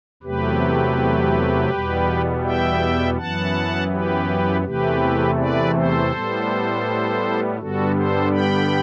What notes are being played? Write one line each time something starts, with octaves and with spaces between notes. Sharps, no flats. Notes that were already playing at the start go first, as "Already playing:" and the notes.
E2 C3 F#3 A3 G4 B4
E2 B2 G3 B3
E5 G5
F#2 E3 B3 F#5 A5
G4 B4
E2 C3 E3 A3 G4 B4
B4 D5
A4 C5
A2 G3 B3
G2 D3 G3 B3 F#4 A4
A4 C5
G5 B5